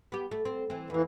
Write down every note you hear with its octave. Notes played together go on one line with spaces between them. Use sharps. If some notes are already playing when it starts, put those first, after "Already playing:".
B3 G4
A3
C4
E3 C4
E2 E3 A#3